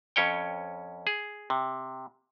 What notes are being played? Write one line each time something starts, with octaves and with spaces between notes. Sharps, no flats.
F2 C#4 C#5 G5
G#4
C3